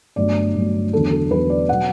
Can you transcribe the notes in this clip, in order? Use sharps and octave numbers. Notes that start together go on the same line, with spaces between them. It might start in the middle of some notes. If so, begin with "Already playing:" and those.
G1 G2 F#3 A3 D5
G1 G2 F#3 A3
E2 D3 F#3 B3 A4
A4
E2 D3 F#3 B3 B4
D5
B2 F#3 F#5